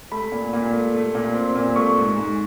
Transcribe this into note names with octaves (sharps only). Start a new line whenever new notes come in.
A3 B5
A#2
A#2
A3
A3
A#2
C4
A#2
A3 C#6
G#2
G#2